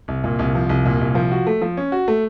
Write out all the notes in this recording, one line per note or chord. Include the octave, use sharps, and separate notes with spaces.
C2
A#2
C2
F3
C2
A#2
C2
F3
F#4
A3
F3
C#4
F#4
A3